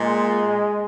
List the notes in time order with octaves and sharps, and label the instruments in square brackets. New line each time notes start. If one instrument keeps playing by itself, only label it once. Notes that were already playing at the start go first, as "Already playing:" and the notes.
Already playing: [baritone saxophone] A#2 [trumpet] G#3